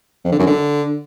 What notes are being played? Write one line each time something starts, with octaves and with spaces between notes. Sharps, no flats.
F2
D3
F#2
D3